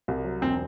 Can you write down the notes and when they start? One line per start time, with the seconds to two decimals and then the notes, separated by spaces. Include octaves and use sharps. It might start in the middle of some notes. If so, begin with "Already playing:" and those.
0.08 C2
0.24 F#3
0.42 E1 C4